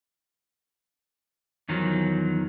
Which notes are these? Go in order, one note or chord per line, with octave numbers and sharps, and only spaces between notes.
E2 D#3 F3 F#3